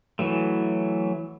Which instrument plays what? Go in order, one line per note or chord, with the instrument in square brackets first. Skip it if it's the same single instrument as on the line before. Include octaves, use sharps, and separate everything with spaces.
[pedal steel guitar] E3 F#3 A3